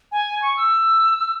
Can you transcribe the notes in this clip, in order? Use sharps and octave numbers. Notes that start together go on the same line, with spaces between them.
G#5
C#6
E6